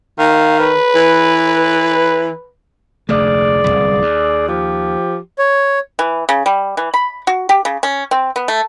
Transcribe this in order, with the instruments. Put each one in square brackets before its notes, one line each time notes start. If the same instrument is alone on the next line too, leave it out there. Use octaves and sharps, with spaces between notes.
[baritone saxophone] D#3 [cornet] F5
[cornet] B4
[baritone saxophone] E3
[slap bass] F1 D2 A3 [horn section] G#4 D5
[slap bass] D1 G1 C2
D#2
[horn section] F3 G4
[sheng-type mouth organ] C#5
[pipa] E3
C#3
G3
E3
B5
F#4
G4
C#3
C#4
C4
B3
A3